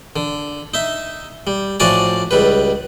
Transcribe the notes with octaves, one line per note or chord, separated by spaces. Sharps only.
D3
D#4 E5
G3
A2 F3 F#4 D5 G#5 A5
C#2 G3 B4